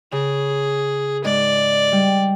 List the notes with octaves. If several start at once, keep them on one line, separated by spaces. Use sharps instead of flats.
C#3 G#4
G#2 D5
G3